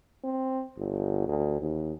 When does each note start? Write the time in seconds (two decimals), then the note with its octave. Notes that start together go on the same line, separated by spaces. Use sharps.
0.24 C4
0.78 G1
1.28 D2
1.60 D#2